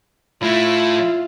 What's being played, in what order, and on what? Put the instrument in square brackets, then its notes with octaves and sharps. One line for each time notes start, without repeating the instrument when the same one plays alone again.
[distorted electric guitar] A2 A3 [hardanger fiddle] E4 [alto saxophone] F4